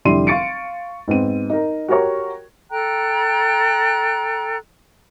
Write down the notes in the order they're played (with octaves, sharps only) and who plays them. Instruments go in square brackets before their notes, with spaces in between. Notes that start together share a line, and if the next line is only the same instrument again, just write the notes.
[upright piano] F1 D3 G3 E4 C6 D#7
F5 C6 C#6 A6 C#7 D7
G#2 B3 C4 D#7
D#4 A#4
F#4 G4 A#4 C#5 C#6
[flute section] A4 G5 A#5 F#6